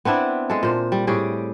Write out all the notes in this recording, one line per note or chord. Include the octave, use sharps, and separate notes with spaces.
B3 C4 D4 E4
G#3 A4
A#2 C5
G3
A2 G3 G4 G#4